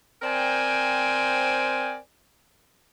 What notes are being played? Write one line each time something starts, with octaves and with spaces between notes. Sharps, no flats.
C4 A#4 C5 D5 G5 G#5